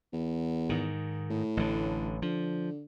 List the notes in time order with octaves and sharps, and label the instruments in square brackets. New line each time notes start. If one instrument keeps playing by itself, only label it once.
[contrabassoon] E2
[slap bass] G#2 D#3
[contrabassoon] A2
[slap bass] A1 D3
[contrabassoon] D3 [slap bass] F3